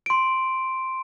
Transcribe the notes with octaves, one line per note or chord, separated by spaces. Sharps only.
C6 D7